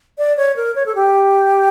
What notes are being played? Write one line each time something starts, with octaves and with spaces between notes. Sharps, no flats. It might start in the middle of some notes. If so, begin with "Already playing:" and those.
D5
C#5
A#4
C#5
A4
G4